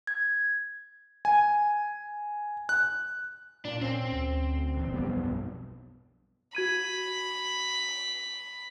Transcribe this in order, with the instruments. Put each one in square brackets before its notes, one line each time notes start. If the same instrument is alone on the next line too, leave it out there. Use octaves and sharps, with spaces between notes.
[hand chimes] G#6
[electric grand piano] G#5
F#6
[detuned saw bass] A#2 [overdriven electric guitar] D4
[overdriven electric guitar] C4 [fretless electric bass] C#4
[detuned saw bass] D2
[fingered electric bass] D#1 E2
[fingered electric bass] B1 F2 [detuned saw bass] G3 [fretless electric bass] B3
[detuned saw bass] G2
[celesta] F#4 G#6 D#7 [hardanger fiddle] B5